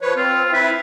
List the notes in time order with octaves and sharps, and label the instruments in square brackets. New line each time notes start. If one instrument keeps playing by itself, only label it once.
[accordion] F3 B4 C#5
[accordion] C4 [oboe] F4
[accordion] E4 E5 [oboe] B4